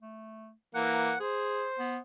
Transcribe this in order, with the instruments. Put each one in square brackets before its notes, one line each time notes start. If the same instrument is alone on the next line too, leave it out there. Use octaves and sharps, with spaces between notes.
[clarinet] A3
[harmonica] E3 A#3 [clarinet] F#5
[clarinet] G#4 [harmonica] C5
[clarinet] B3